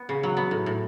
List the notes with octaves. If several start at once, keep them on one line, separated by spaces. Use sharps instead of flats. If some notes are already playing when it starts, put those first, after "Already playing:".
Already playing: B3
C#3
F#3
B3
A2
A2